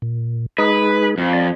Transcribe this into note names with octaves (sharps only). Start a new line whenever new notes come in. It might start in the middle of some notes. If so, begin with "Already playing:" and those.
A#2
G#3 D#4 G#4 B4
F2
D5